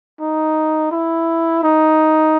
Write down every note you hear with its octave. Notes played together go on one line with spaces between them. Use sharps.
D#4
E4
D#4